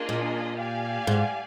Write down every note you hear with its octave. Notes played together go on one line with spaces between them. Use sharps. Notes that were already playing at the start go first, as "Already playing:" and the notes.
Already playing: A#3 D4 F4 G#4 D#5
A#2
G4 D5 F5 G#5
G#2